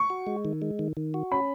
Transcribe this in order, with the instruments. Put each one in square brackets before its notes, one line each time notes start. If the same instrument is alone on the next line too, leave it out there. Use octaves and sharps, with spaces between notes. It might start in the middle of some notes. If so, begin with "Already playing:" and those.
Already playing: [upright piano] C#6
[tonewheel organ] F#4
G#3
D#3
G#3
D#3
D#3
F#4
[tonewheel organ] C#4 [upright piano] B5